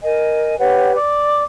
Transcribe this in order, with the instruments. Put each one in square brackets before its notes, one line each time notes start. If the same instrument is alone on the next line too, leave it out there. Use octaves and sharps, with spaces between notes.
[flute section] A#4 D#5 G#5
G4 B4 C#5 F#5
D5 D6